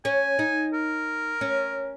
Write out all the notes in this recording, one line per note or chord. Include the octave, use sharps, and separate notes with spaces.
C#4 G#5
D#4
A#4
C#4